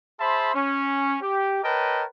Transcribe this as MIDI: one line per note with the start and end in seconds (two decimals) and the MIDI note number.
0.20 0.53 68
0.20 0.53 72
0.20 0.53 76
0.20 0.53 81
0.20 0.53 83
0.20 0.53 84
0.55 1.16 61
1.22 1.60 67
1.64 2.05 70
1.64 2.05 71
1.64 2.05 73
1.64 2.05 75
1.64 2.05 79
1.64 2.05 81